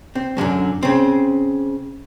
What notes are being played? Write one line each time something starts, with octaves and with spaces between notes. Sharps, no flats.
C4
F#2 D3 F3 F#3
C#3 C4